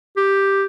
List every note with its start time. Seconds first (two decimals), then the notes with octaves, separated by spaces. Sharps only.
0.17 G4